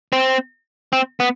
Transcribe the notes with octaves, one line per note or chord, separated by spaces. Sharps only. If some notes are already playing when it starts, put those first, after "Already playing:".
C4
C4
B3